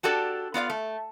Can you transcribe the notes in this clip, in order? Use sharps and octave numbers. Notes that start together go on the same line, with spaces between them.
D4 F#4 G4 A4 D5
B3 F4 D5 F5
A3